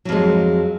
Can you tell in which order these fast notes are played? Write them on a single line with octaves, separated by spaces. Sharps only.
F#3 F2 G#3